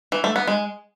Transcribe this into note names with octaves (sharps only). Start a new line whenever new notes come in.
E3
A3
B3
G#3